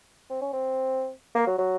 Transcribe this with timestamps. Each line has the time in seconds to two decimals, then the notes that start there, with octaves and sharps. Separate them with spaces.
0.30 C4
0.42 C#4
0.53 C4
1.35 A#3
1.47 F#3
1.58 F#3